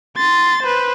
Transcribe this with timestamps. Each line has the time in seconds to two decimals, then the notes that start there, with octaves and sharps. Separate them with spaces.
0.17 C6 A6
0.63 B4 C5